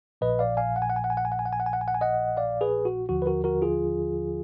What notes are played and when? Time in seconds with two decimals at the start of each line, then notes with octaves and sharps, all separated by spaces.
0.21 A#1 A#2 F3 B4 D#5
0.39 D5 F5
0.57 F5 G#5
0.76 F#5
0.82 G#5
0.90 F#5
0.96 G#5
1.04 F#5
1.10 G#5
1.17 F#5
1.25 G#5
1.32 F#5
1.39 G#5
1.45 F#5
1.53 G#5
1.60 F#5
1.66 G#5
1.73 F#5
1.81 G#5
1.88 F#5
1.95 G#5
2.01 D#5 F#5
2.37 D5 F5
2.61 G#4 B4
2.85 F#4
3.09 D#2 D3 F3 F#4
3.22 B4
3.26 F#4 A#4
3.44 F#4 A#4
3.62 F4 G#4